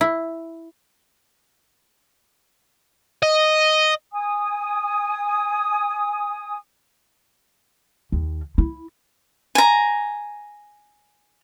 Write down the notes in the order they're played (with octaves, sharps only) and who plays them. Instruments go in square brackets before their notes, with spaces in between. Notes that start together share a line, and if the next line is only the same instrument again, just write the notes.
[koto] E4
[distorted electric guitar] D#5
[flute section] G#5 D#6
[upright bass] D#2
E4
[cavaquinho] G#5 A#5